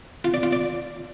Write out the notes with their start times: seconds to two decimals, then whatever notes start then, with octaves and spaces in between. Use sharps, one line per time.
0.24 F4
0.34 D5
0.43 F4
0.53 D5